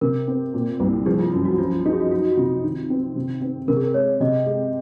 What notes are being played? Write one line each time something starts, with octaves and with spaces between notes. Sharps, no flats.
C3 A#4
C4
A#2
C2
F3 G#4
F4
F#2 F4
F#4
F3 F4
D#4 F#4
G#4
F#4
F#3 F#4
F#4
C3 F4
D#3
C4
C3
C4
C3 A#4
G#4
A#4
G#3 C#5
C3 D#5
G#3